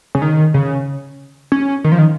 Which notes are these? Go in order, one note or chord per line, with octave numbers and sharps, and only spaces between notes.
C#3
D#3
C#3
C#4
D#3
F3
D#3